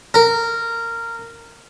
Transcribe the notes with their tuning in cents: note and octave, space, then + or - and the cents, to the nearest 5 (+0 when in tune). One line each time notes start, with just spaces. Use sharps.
A#4 -15